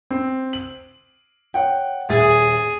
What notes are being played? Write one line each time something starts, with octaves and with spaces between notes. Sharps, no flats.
C4
F#7
C#5 F#5 G5
D#1 G#4 E5 A6